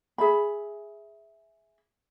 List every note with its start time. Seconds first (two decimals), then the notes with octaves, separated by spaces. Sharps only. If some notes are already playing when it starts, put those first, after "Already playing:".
0.18 G#4 E5 B5